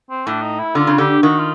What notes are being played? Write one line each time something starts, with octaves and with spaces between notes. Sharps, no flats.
C4
A2 D4
D#4
E4
D3 F4
C#3
D3 G4
D#3 F#4
F4